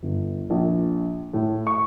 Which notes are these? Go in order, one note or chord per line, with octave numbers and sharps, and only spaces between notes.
G1
A#1
A2
C#6